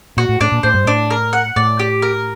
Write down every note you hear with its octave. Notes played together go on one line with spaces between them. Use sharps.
A#2 F#4
A2
A2 D4
A#2
A2 C5
G2
A2 D4
A#4
F#5
A2 D5
G4
A#4